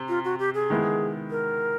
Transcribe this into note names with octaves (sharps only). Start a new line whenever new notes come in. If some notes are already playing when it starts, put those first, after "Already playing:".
Already playing: C3 C4
F4
F#4
G4
G#4
D#3 G#3 B3 E4
A#4